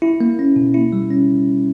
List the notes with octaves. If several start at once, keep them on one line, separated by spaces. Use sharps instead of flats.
E4
A#3
C#4
B2
E4
G3
C#4